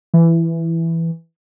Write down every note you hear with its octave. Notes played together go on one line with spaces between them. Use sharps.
E3